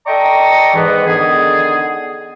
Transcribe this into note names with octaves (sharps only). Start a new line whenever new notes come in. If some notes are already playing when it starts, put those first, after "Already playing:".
A4 D5 D#5 G5 A#5 C#6
G#2 E3 B3
D3 D#3 B3 G#4